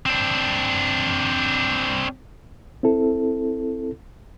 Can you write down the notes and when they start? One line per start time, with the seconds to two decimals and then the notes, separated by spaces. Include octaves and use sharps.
0.06 C4 D4
2.83 C4 E4 A4